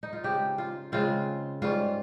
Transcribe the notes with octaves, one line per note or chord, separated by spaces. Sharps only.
D#4
F4
C#3 G#3 C4 G4
F4
C#3 G#3 C4 F4
G#2 G3 C#4 F4